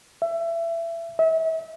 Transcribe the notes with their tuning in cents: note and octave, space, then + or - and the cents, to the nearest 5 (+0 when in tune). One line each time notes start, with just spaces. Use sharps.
E5 +25
E5 -35